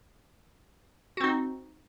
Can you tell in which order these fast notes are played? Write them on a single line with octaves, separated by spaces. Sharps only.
F#4 C4 D#4